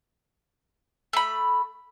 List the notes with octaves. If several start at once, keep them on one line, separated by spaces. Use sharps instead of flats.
A3 B5